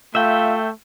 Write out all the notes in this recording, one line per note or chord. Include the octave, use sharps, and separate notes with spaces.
A3 F4 E5 G5